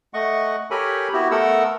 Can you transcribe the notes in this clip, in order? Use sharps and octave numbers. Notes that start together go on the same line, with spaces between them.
A3 D#5 F#5 C#6
G4 A4 A#4 C#5 G#5 B5
B3 E4 F#4 G4
A3 B3 A4 A#4 F#5 E6